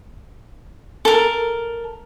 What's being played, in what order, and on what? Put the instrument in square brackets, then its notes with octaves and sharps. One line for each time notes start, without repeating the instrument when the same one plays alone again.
[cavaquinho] A4 A#4